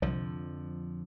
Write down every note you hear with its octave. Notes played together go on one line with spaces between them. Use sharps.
C2 F2 D3 F3